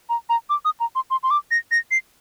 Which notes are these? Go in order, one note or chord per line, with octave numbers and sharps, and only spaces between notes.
A#5
A#5
D6
D#6
A#5
C6
C6
C6
D6
A#6
A#6
C7